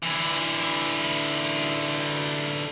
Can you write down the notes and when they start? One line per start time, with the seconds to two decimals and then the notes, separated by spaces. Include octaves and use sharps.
0.03 D3 E3